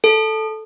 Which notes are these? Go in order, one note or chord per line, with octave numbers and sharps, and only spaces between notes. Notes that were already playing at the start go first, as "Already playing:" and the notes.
A4